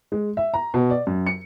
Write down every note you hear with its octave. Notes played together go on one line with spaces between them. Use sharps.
G#3
E5
A#5
B2
D5
F#2
C#7